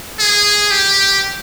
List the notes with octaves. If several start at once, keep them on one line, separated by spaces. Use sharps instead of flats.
G#4
G4